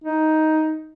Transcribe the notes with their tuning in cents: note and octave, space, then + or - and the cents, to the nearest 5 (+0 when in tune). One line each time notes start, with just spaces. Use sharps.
D#4 +10